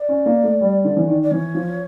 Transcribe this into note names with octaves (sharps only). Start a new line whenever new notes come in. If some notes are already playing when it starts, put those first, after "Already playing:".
Already playing: D5
C#4
A#3
A3
G3
D3
E3
D#3
D5
E3 C#5
F3